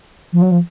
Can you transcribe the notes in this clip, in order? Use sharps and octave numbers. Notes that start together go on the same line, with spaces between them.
F3
F#3
F3